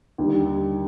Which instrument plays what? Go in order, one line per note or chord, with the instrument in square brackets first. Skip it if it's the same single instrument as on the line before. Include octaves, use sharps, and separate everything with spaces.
[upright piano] D#2 D3 G3